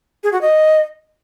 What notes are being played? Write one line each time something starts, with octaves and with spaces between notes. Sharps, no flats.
G#4
F#4
D#5